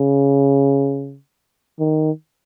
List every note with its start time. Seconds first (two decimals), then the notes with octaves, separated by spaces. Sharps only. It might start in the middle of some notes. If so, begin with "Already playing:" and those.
Already playing: C#3
1.80 D#3